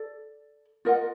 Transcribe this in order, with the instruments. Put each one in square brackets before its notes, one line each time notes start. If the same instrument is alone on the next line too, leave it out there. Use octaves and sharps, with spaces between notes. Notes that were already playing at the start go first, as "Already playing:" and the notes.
Already playing: [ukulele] A4 D5
F4 A#4 D#5 F#5